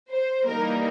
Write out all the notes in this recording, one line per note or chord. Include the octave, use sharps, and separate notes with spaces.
C5
E3 G3 A#3 D#4 A#4